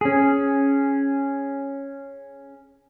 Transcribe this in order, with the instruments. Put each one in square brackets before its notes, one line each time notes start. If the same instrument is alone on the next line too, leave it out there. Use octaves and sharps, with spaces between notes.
[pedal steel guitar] C#4 G#4